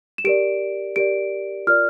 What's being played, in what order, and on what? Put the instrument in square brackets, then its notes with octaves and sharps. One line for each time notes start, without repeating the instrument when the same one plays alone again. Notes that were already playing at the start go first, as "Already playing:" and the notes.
[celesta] E7
G4 A#4 D5 D7
G4 A#4 D5 D7
F4 A#4 D5 F6